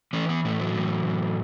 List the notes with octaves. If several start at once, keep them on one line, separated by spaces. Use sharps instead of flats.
E3 C#4
B3
A2 A3
F#3
E3
A2